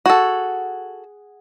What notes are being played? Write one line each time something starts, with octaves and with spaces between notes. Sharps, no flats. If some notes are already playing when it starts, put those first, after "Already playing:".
F#4 G#4 A4 F#5